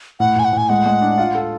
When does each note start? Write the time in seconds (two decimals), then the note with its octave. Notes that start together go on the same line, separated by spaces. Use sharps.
0.20 A2 F#5
0.36 A2 G#5
0.45 F#5
0.53 A2 G#5
0.69 G#3 F#5
0.86 G#3
1.01 D4
1.18 F4
1.35 A4